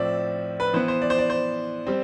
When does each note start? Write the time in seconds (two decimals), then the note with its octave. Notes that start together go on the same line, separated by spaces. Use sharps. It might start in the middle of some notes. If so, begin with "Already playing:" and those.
Already playing: A2 F3 C4 D5 E5
0.60 B4
0.73 E3 B3 C5
0.88 C5
1.02 D5
1.10 C5
1.18 D5
1.30 C5
1.87 G3 C4